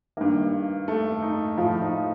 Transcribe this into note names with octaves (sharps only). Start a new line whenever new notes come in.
G2 D#3 A#3
A3
D#4
A2 F3 F4
D#4